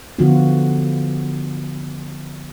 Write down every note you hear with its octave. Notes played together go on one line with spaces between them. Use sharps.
D3 F3 B3 F4 F#4